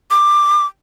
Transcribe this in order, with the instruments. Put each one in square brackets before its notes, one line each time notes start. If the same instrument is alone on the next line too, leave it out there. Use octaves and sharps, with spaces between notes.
[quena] D6